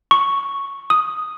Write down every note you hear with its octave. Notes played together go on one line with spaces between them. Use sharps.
C#6
D#6